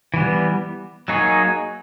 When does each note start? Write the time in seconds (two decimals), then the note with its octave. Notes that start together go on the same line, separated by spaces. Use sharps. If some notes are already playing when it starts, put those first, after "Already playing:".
0.14 E3 G3 B3
1.08 F#3 A#3 D#4 G#4 C#5